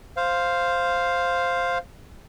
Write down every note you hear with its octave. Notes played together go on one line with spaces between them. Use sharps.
C5 F5